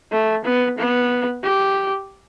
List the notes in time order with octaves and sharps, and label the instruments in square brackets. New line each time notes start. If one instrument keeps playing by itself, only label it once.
[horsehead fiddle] A3
B3
B3
G4